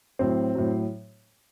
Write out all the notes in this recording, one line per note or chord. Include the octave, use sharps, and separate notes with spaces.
A2 F#3 C4
A2 F#3